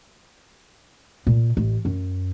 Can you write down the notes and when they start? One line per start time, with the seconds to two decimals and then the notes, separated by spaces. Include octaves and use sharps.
1.27 A#2
1.57 A1
1.85 F#2 C#4